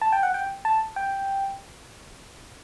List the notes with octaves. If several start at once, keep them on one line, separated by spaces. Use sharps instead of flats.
A5
G5
F#5
G5
A5
G5